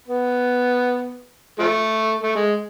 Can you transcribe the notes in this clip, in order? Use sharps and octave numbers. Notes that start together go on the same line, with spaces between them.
B3
F3 A3
A3
G#3